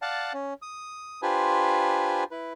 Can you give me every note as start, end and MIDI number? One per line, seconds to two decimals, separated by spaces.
0.02 0.33 74
0.02 0.33 77
0.02 0.33 78
0.02 0.33 81
0.34 0.54 61
0.62 1.21 87
1.22 2.24 62
1.22 2.24 65
1.22 2.24 67
1.22 2.24 71
1.22 2.24 72
1.22 2.24 80
2.31 2.53 64
2.31 2.53 71